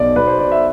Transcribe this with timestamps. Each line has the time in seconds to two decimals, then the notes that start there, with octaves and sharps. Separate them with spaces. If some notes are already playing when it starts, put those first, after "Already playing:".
Already playing: B1 B2 D5
0.16 B1 B4
0.27 C5
0.39 B2 D5
0.52 E5